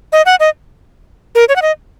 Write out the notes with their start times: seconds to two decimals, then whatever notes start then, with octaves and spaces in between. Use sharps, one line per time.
0.12 D#5
0.26 F#5
0.40 D#5
1.35 A#4
1.49 C#5
1.56 F#5
1.62 D#5